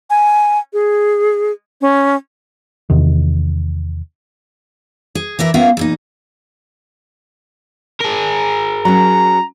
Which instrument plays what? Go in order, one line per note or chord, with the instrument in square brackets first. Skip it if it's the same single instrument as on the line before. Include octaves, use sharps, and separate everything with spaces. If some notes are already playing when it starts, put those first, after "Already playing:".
[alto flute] G#5
G#4
C#4
[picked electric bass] E2 C3 D#3
[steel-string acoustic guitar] G#4
E3 D4 A#4 E5
B3 C#4 F4 A#4 E5 F5
E2 A#2 D#4
[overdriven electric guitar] G#4 A#4
[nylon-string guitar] F#3 C#4 [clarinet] A#5